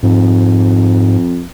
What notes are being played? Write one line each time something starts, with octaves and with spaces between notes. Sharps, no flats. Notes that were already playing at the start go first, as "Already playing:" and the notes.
F2 G#2